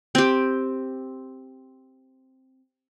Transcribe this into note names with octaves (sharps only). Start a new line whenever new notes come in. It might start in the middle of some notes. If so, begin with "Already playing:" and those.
C4 G4